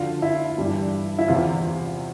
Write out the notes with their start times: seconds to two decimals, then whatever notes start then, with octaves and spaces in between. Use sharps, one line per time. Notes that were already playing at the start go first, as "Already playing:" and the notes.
Already playing: D2 D3 F3 F4
0.22 E4
0.58 G2 E3 G3
1.18 E4
1.28 E2 C3 E3 F4